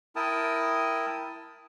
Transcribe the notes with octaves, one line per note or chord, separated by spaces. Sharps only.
E4 A#4 G5 A5 D#6